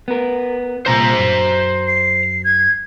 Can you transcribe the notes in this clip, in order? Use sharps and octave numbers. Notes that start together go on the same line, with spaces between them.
B3 A#4
C2 A#2 C5 A#5
F#2
C7
G#6